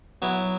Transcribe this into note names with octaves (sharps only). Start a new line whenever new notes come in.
F#3 B3 E4